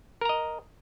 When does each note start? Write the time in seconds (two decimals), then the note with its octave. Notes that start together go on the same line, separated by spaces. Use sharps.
0.21 A#4
0.25 A#5
0.29 D#5